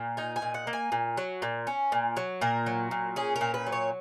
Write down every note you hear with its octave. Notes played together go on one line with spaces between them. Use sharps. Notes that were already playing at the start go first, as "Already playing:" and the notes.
Already playing: A#2
D#4 G#5
G#5
A#2
F#5
A#3
G#5
A#2
F#3
A#2
C#4
A#2
F#3
A#2 A#4
F#3
A#2
C#4 G#4
A#4
A#2
B4
F#3
C#5